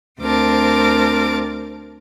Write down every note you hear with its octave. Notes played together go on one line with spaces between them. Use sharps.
D2 C4 A#4 A5 D6